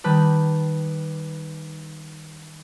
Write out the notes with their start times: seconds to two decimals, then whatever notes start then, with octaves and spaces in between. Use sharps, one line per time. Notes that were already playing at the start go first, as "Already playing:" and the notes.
0.04 D#3 G3 B4 A5